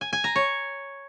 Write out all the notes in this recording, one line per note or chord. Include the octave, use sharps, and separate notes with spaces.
G#5
G#5
A#5
C#5